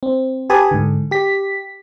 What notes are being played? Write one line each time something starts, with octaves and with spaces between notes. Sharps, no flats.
C4
G4 B4 G#5 A5 B5 D#6
G#2 D3
G4 B6